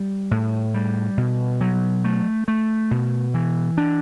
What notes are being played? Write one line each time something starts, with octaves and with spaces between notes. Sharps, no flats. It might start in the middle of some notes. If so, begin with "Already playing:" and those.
Already playing: G3
A2
G3
B2
F#3
A3
A3
B2
E3
D4